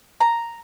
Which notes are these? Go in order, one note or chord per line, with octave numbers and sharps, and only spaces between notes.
A#5